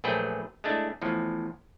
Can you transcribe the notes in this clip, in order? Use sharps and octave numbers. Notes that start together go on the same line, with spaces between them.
A#1 F#3 A3 G#4 B4 G5
G#3 A3 D4 E4
E2 A2 F3